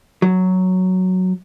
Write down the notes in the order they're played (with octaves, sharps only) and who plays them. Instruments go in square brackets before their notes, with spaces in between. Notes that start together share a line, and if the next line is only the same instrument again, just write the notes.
[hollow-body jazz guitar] F#3